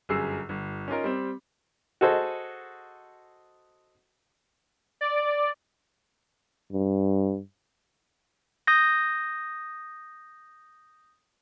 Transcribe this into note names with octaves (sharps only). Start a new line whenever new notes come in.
G1 F#2 G#4 E6 C7
G1
C#4 D#4 F4 A#4
G3 C4
F#4 G#4 A4 C5 D#5
D5
G2
D#6 G6 A#6